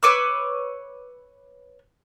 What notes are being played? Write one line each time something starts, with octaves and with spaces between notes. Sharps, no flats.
B4 C#5 D6 E6